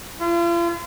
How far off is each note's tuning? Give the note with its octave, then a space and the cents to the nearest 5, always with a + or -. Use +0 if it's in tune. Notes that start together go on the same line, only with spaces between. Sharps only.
F4 -40